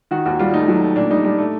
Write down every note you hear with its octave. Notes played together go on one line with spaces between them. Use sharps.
D#3 F#4
D#2 F#4
G3 F4
A3 D#4
F#3
A3
A#2 D4
G3 D#4
G3 D4
A3